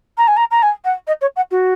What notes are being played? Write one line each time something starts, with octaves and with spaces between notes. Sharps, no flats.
A#5
G#5
A#5
A#5
G#5
F#5
D#5
C#5
F#5
F#4